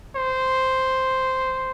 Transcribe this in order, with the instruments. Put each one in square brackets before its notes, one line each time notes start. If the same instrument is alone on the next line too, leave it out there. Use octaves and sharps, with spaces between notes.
[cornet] C5